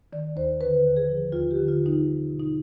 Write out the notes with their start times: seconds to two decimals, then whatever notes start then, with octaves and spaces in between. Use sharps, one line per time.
0.13 D#3 D5
0.36 D#2 C5
0.60 D3 B4
0.85 D#2
0.97 G#4
1.09 F3
1.32 D#2 F4
1.51 G4
1.56 D3
1.68 F4
1.81 D#2
1.86 D#4
2.04 G3
2.28 B2
2.40 D#4